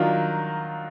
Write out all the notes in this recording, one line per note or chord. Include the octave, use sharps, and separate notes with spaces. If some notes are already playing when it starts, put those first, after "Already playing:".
Already playing: D#3 F#3 D4 F4